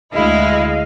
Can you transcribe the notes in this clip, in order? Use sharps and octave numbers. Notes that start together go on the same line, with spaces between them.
D2 G#3 E4 D#5 F5